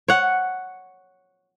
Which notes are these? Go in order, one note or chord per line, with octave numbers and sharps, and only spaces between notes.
C#5 F#5